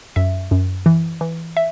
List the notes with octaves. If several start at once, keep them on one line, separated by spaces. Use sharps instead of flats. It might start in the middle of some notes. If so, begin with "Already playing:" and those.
F#2 E5
F#2
E3
E3
E5